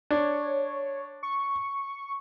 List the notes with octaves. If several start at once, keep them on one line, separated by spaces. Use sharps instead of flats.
D4 C#5
C#6